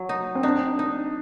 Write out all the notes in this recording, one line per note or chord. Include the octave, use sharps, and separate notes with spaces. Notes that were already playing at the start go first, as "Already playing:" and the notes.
Already playing: F#3
D#4
C4
D4 D#4
D#4